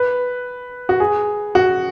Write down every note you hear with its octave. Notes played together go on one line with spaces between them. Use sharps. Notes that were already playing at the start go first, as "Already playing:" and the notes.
Already playing: B4
F#4
G#4
F#4